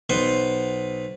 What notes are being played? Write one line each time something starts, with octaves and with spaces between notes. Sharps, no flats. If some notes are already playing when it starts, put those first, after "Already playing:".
B1 B3 B4 C5